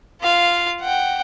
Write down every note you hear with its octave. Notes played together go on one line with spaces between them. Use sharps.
F4 F5
F#5 G5